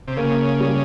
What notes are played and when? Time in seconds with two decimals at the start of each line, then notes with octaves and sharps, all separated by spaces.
0.08 C3
0.17 C#3 A#3
0.60 G3